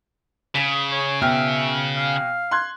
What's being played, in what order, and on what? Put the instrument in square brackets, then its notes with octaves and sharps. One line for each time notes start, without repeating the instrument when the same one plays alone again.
[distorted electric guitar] C#3 [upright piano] B6
[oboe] C#5
[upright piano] B2 G5 F6 [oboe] E5
[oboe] F5
[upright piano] C6 F#6 G#6